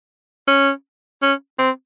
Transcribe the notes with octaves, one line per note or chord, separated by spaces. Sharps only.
C#4
C#4
C4